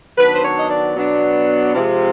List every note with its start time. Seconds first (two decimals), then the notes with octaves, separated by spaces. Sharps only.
0.17 D#3 F#3 B3 D4 B4
0.34 C5
0.44 C#5
0.57 D#5
0.70 D5
0.97 B2 F#3 B3 D4
1.75 C3 F3 G#3